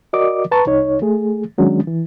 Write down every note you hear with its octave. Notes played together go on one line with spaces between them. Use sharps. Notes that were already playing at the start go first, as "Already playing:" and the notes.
F#4 A#4 D5 D#5 D6
B4 A5 A#5 C#6
C2 D#4 C#5
A3 G#4
D#3 F#3 G#3 C#4 D4
E3